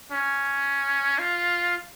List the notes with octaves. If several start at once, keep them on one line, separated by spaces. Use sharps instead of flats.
C#4
F4